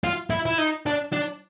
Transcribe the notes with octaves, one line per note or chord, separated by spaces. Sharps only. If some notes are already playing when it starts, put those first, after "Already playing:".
F4
E4
E4
D#4
D4
D4